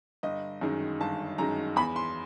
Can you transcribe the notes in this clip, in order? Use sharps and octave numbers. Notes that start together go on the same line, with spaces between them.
G1 D#5
F#2 D#3 G#3
G1 A5
F#2 D#3 G#3 A#5
E2 B5
C6